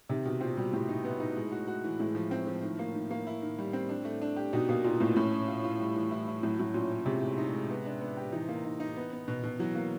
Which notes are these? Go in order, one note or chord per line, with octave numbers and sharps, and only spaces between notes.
C3 D#3
B2 D#3
A#2 C4
B2 G3
A2 G4
D#4
B3
D#4
G#3
F#4
F#4
E3
A2 G#3
F3
C4
F3
D#3
A#3
D#3
A#3
E4
D#3
G3
C4
D4
A3
D4
G4
B2 D#4
B2 A#3
A#2 D#4
A2 A#3
A2 C#4
C#4
F4
F4
G3
E3
E4
E4
A2 F#3
A2 F#3
A#2 C#4
C#4
C3 G#3
G#3
D#4
G#3
B3
D4
B3
G4
E3 D#4
A#3
D#4
D#4
B3
B3
B2
B2
E3 F#3
A#3